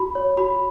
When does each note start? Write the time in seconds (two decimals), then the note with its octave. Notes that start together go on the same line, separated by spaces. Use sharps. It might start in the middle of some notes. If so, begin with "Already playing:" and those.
Already playing: F#4 B5
0.15 C#5
0.37 F#4 B5